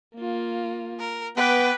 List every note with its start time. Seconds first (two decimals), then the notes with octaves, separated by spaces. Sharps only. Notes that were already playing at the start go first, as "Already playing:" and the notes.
0.15 A#3 F4
1.00 A#4
1.37 B3 B4 G5 D6